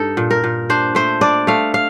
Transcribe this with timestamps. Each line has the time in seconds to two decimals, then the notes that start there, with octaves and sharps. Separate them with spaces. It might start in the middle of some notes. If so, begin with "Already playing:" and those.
Already playing: G2 D4 D#4 A4
0.17 A#2
0.31 A#4
0.44 A#2
0.70 D4 C5
0.95 A3 C5
1.21 D4 D5
1.47 A3 F5
1.74 F5